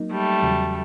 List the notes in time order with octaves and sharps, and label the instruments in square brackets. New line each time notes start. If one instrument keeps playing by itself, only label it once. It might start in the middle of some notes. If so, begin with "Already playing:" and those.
Already playing: [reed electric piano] F#3 A#3 D#4
[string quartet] G3 A3
[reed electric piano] E2 C#3 F#3